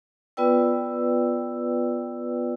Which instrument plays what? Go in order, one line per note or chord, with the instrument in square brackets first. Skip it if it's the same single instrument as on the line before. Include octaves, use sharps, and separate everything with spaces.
[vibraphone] B3 F4 B4 D5 G5 E6